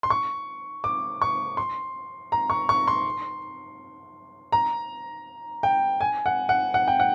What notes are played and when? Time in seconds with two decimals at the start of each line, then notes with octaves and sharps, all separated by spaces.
0.03 C6
0.10 C#6
0.84 D6
1.22 C#6
1.57 C6
2.32 A#5
2.50 C#6
2.69 C#6
2.88 C6
4.52 A#5
5.63 G5
6.01 G#5
6.26 F#5
6.49 F#5
6.74 F#5
6.88 G5
7.00 F#5